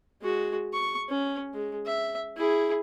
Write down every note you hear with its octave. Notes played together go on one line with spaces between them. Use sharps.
G#3 F#4
C#6
C#4
G#3
E5
E4 G#4